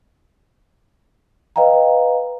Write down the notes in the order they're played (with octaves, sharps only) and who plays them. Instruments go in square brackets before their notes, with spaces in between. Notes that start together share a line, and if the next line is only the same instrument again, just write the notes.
[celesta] B4 D#5 F5 G5 A#5